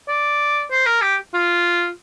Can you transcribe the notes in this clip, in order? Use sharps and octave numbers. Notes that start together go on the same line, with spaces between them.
D5
C5
A#4
G4
F4